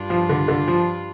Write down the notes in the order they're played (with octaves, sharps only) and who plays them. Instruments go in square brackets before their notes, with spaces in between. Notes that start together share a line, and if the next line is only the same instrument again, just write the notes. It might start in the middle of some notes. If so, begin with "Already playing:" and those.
Already playing: [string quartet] G2 G3 D4 F4
[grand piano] F3
D3
D3
F3